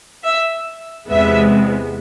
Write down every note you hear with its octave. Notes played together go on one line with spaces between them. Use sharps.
E5
E2 C3 G#3 B3 E5